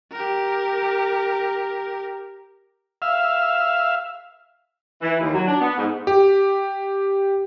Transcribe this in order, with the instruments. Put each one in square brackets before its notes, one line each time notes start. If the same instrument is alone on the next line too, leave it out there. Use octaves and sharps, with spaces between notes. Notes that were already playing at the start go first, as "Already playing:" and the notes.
[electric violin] G4 A#4
[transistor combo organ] E5 F5
[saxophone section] E3
D#2
F#3
D4
B3
G#2
[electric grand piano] G4